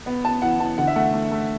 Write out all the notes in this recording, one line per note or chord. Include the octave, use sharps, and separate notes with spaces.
B3
B3 A5
E3 F#5
E3 A5
D3 F#5
E5
A3 F#5
A3
A3